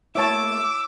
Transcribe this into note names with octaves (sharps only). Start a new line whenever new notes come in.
A3 A#3 E4 C#5 E5 A5 D6 E6